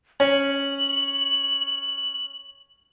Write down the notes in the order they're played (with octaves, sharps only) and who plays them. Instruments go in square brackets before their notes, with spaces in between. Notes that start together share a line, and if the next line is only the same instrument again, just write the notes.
[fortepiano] C#4 [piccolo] F#7